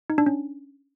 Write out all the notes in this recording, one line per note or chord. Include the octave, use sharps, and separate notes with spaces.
D#4
D4
C#4